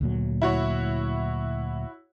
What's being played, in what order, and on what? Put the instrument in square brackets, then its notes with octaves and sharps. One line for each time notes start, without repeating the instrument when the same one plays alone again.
[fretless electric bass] D2 A#2 F#3
[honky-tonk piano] E4 F#4 C#5